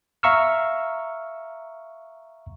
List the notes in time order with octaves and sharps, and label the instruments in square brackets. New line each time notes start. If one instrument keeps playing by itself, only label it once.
[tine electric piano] E5 F5 A#5 C#6 E6 F6